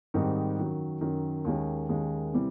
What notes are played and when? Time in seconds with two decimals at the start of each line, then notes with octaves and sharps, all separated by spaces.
0.14 G#2 D#3 G3 C4 D#4
0.58 F#2 D#3 F#3
1.01 F#2 D#3 F#3
1.45 D#2 D#3 G#3 C#4
1.89 D#2 D#3 G#3 C#4
2.33 C3 E3 G3 C4